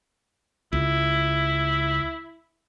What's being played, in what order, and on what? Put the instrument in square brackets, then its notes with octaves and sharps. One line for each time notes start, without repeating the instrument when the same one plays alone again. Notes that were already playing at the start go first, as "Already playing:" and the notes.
[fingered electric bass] C#2 [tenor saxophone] E4